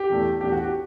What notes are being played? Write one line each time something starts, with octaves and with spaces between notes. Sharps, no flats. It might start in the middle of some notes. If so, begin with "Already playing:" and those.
Already playing: G4
E2 B2 A3 D4
E2 B2 A3 D4 G4
F#4
G4